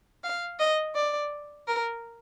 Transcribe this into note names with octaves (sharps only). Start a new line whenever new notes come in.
F5
D#5
D5
A#4